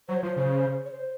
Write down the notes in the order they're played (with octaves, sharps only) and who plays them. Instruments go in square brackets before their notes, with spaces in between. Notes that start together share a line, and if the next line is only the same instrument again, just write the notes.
[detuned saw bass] F#3 [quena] C5
[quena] C#5
[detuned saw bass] F3 [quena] C5
[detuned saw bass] C#3
[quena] C#5
C5